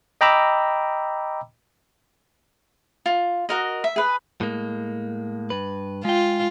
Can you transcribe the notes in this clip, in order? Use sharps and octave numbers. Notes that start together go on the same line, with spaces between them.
D#5 G5 A#5 B5 D6 E6
F4
F#4 A#4 D#5
E5
G#4 B4
A2 G#3 A#3
G2 B4
G#3 F4 G5